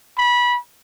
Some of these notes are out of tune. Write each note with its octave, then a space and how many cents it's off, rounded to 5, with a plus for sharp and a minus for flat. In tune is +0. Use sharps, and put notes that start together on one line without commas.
B5 -20